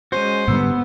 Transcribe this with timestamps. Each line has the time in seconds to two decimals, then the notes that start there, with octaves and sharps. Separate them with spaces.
0.12 G#3 C#4 F#4 C5
0.48 G#2 D3 G3 B3 F#5 E6